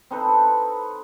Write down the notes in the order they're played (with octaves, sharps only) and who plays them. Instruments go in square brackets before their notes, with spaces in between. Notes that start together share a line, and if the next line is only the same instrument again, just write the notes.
[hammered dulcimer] C4 D#4 A4 B4